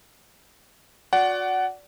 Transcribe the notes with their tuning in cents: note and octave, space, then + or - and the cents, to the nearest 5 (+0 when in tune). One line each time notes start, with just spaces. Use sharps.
F#4 -35 D5 -20 F#5 +15